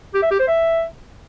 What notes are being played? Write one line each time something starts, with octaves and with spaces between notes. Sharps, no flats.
G4
E5
G4
C5
E5